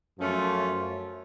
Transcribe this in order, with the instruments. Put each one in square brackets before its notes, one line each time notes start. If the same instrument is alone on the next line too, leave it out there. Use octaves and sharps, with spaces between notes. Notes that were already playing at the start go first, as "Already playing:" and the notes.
[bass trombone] F#2 [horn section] F3 A3 C#4 F4